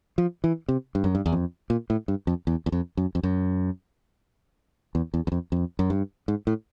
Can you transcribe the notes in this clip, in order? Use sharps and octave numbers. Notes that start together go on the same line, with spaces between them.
F3
E3
C3
G2
F#2
G2
E2
F2
A#2
A2
G2
F2
E2
E2
F2
F#2
F2
F#2
E2
E2
E2
F2
F2
F#2
G2
G#2
A2